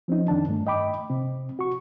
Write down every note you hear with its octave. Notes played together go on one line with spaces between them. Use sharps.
F3 C4 C#4 D#4
F2 D#3 D4 A5
G2 A3
D#5 G5 B5 D6
C3 C4
F#4 C#6